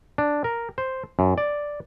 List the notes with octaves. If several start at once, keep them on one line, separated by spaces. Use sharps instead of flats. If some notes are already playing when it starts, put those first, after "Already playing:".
D4
A#4
C5
F#2
D5